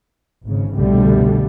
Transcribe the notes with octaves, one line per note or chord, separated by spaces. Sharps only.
G#1 C#3
C2 F2 B2 D3 G3 A3